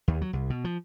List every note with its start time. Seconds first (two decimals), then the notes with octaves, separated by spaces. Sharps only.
0.08 D#2
0.22 F#3
0.33 C2
0.50 B2
0.64 F3